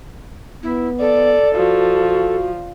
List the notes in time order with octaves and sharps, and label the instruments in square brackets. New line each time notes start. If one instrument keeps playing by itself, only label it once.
[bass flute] B3 [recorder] E4
[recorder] A4 [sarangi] D5
[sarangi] F3 [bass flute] F#4